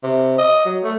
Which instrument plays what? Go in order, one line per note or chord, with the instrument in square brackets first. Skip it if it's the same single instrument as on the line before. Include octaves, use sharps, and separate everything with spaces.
[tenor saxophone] C3
D#5
F#3
A3